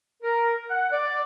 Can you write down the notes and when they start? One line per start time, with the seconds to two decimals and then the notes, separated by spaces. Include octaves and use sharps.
0.21 A#4
0.69 F#5
0.91 D5